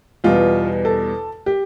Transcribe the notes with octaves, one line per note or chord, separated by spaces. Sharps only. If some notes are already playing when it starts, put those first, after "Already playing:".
E2 B2 G3 F4
A4
G4